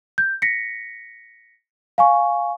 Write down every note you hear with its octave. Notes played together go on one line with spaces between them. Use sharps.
G6
A#6 B6 C#7
F5 G#5 C#6